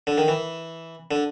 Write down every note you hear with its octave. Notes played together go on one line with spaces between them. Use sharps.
D3
D#3
E3
D3